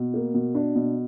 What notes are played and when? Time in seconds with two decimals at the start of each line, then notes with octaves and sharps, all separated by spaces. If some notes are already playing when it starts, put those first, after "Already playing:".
Already playing: B2
0.14 A#3
0.34 B2
0.55 D4
0.75 B2